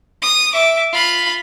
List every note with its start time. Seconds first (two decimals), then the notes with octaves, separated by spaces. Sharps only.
0.21 D#6
0.53 E5 D6
0.92 F4 B5